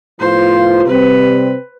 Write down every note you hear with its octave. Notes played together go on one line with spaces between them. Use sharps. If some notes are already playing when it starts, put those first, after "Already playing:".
A2 F3 B3 F4 C5
C3 G3 C4 B4